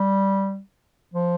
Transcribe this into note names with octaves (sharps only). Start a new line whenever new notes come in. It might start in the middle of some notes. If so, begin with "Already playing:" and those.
Already playing: G3
F3